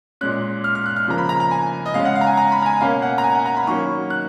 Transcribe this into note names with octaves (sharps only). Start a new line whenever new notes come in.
A#2 G#3 C#4 F#6
F6
F6
F#6
F6
C#3 F3 A#3 A#5
B5
A#5
A#5
G#5
D#5
C#3 G#3 C#4 F5
F#5
F5
A#5
G#5
A#5
B5
A#5
G#5
B2 A#3 C#4 F5
F#5
A#5
G#5
F#5
A#5
B5
D#3 F#3 A#3 C#4 C#6
F#6